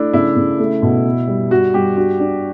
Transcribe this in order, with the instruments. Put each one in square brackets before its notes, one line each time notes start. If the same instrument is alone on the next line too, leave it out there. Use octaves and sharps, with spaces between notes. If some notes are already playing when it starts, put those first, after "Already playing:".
Already playing: [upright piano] A3 [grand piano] D4 E4
[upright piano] C#3 [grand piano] E4
[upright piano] C#3
A3
B2
B3
G3
[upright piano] G2 [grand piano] F#4
[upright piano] G2 [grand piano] G4
[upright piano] D4 [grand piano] F#4
[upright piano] D4